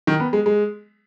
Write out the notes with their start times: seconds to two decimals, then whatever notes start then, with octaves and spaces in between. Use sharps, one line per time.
0.07 D#3
0.20 B3
0.33 G#3
0.46 G#3